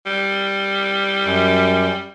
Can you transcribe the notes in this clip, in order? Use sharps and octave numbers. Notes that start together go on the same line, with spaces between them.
G3
F#2